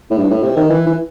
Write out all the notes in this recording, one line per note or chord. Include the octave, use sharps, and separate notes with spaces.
A2
G2
A2
C3
D#3
E3
E3